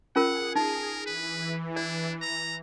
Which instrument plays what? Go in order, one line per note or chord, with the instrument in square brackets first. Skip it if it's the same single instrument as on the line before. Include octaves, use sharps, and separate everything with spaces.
[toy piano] C#4 F4 A#4 [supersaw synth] G#4 [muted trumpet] F#5
[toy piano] D#4 [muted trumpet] A#4
[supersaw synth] E3 [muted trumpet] B4
[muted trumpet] D4 [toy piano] D5
[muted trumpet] A#5